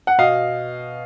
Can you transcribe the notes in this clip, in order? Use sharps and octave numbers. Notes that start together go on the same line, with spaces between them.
F#5
B2 D#5 F5